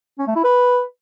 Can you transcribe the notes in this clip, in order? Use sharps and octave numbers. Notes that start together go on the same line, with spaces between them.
C#4
A3
E4
B4